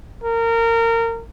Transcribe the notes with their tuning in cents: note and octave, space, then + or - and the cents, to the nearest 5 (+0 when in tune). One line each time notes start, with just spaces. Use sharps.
A#4 -25